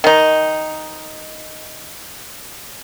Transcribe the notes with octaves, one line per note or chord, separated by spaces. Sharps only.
D#3 D#4